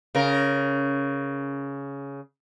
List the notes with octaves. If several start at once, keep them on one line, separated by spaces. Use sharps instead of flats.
C#3 A#4